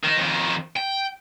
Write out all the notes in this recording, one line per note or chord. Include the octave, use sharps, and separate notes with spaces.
D#3 D#4
F2 D#3
G5